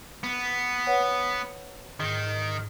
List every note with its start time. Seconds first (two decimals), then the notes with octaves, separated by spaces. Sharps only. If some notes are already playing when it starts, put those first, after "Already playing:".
0.24 B3
0.87 B4 C#5 F#5
2.00 G#2 D#3